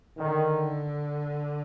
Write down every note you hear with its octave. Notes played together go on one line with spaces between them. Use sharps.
D3 D#3